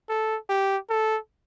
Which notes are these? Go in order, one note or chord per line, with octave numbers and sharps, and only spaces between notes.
A4
G4
A4